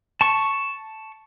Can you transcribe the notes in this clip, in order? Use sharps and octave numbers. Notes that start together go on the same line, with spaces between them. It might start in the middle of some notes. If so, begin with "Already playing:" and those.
A5 C#6